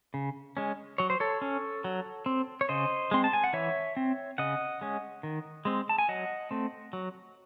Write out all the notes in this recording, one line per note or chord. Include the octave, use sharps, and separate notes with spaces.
C#3
G#3 C#4
F#3 C#5
C5
A4 C#5
C#4
F#3
C4
C#5
C#3 C5 D#5
G#3 C4 C6
A5
G#5
F#5
E3 C#5 E5
C4
C#3 D#5 F#5
G#3 C#4
D#3
G#3 C4
A5
G#5
F#3 D#5 F#5
A3 C4
F#3